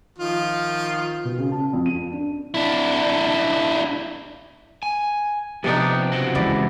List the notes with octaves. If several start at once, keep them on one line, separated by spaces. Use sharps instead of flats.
D#3 F3 F4
B2
C#3
A5
F2
D#7
D4
D4 E4
G#5
C3 F3 B3 D4 D#4 G4
C#3 C4 F#4
E3 G#3 E4 D5